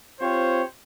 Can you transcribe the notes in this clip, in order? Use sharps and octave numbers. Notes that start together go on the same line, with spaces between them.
C4 F4 G4 C5 C#5